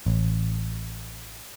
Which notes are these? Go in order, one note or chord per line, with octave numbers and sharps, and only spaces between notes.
A1